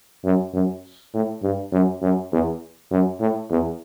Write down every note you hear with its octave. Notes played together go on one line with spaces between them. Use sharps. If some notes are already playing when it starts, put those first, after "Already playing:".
F#2
F#2
A2
G2
F#2
F#2
E2
F#2
A2
E2